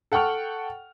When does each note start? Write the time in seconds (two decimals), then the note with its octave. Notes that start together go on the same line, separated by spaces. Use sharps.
0.12 A4 F#5 G5 C#6 F6